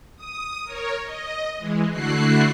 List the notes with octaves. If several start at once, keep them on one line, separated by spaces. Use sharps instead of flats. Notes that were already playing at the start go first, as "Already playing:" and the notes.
D#6
A#4 C#5
D#5
E3 G#3
D3 A3 E4 F#4 F#6 C7